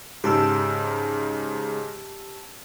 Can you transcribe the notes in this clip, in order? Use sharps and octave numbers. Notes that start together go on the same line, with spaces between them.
G#2 C#3 G4 A5 E6